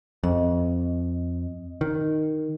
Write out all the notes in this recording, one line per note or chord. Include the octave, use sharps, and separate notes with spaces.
F2 D#5
D#3